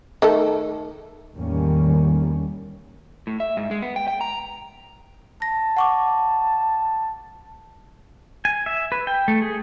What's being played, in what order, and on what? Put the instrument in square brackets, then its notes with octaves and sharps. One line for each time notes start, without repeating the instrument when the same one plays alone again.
[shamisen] D#3 A3 A4
[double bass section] E2 A2 D#3 G3 A#3 C#4
[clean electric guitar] A2
E5
G#2
G#3
B3
G5
G5
A#5
[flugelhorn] A5 [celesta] A#6
[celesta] F#5 C#6 D6
[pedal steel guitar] G#5
E5
B4
G5
A3
G#4